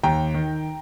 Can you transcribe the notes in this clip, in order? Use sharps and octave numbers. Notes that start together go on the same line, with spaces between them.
D#2 G5 A#5
D#3